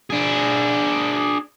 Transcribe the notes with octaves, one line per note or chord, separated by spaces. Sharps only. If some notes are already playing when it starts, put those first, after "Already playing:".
D4 G#4